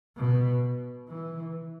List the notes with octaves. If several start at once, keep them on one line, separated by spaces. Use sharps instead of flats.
B2
E3